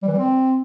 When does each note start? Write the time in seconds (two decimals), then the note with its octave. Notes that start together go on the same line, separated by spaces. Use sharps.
0.03 G3
0.08 E3
0.13 G3
0.18 C4